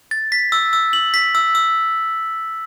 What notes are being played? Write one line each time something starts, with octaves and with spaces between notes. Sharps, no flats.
A6
B6
E6
E6
F#7
B6
E6
E6